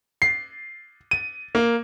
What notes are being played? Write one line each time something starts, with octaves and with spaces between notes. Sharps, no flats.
C7
D#7
A#3